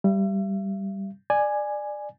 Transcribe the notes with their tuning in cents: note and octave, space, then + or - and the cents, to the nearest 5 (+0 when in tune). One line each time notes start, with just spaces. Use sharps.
G3 +0 E5 +40
D5 +20 G#5 +0